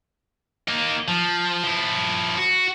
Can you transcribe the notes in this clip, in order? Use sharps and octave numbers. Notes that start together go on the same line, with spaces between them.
A#3 D#4
F3
F3 E4
F#4